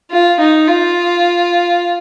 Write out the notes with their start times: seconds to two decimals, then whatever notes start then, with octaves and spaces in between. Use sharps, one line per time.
0.11 F4
0.39 D#4
0.68 F4